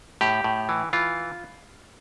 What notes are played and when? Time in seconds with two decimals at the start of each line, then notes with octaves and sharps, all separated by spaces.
0.21 A2 G4
0.44 A2
0.69 E3
0.93 E3 F4